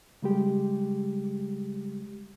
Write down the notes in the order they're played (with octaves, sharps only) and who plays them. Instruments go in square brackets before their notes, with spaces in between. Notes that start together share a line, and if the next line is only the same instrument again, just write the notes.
[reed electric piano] C#3 G3 G#3 G4